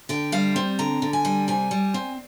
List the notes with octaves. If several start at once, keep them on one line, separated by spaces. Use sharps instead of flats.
D3 G5
G3 F5
C4
D3 A#5
D3
G#5
G3
C3 G#5
G3
C4